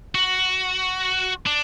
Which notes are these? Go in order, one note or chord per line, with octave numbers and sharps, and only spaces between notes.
F#4
D4